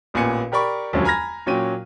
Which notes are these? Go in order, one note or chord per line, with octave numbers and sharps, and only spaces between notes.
A1 A#2 B3 G#5 C#7
G4 A#4 D5 B5 C#6
E1 D2 G2 F3 F#3 C#4
G#5 A#5 B5 F6 G#6 A#6
A#2 F#3 C#4 G5 D#7